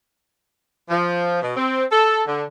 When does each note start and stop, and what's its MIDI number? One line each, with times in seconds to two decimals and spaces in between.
0.90 1.41 53
1.42 1.55 47
1.56 1.83 60
1.91 2.21 69
2.27 2.43 50